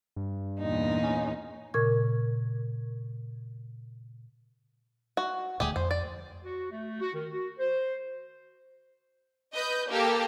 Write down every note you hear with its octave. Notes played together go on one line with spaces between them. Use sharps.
G2
E2 A#2 D#4
C#4
A#2 C#3 A#4 C#6 G#6
F#4
D#1 D2 A3 G4 G#4
F2 C5
D5
F#4
A3
F#4
D#3
F#4
C5
B4 D#5 G6
A#3 G4 A4